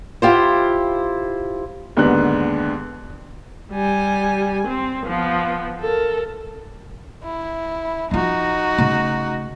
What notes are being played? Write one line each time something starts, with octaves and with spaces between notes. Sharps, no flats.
E4 F4 G4 C5
D#2 G#2 D3 B3 F#6
G3 G#5
C4
F3 B3
A4 A#4
E4
F3 D#4 F4 F#4
C#3 A3